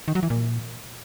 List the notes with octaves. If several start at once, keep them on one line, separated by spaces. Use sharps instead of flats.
D#3
F#3
E3
A#2